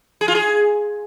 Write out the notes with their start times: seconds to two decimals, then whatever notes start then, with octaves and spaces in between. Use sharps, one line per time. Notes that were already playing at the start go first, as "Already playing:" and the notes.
0.21 G#4
0.28 F4
0.35 G#4